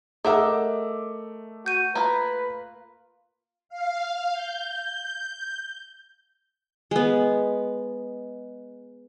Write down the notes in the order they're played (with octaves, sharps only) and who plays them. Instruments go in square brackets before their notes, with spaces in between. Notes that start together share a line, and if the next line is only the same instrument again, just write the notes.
[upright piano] A3 D6 E6 [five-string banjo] D#4 E5 F#5 [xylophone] G#4 A#4
[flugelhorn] F#4 [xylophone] G6 D#7
[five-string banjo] A#3 F4 [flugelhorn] B4
[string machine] F5
G6
[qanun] G#3 B3